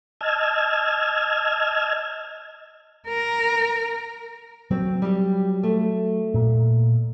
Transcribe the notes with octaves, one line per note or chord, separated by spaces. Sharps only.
D#5 A5 E6 F6 G#6
A#4
F#3 C4
G3 G4
A3
A#2